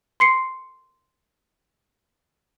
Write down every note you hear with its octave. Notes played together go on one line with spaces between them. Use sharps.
C6 C7 C#7